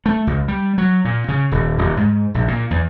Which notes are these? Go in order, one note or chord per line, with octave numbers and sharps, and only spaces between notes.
A3
C#2
G3
F#3
A#2
C#3
D#1
D#1
G#2
A#1
A#2
E2